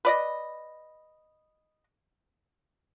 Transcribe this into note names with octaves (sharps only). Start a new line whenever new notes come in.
B4 D5 D#5